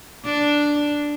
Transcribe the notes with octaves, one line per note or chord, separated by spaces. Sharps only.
D4